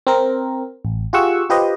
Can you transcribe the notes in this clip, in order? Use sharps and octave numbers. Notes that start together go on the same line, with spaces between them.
C4 A#4
A1
F4 G4 G#4 F#5 C#6 E6
F4 G4 B4 C5 D#5